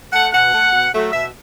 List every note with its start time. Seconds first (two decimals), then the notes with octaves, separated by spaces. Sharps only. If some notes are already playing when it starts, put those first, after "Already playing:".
0.12 A3 F#5
0.33 B2 F#5
0.52 A3
0.72 B2
0.92 F#3 A3
1.12 B2 E5